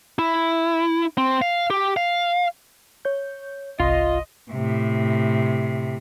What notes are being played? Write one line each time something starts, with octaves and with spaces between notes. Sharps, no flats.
E4
C4
F5
G4
F5
C#5 G6
G1 C2 F4 D#5 C6
A2 C3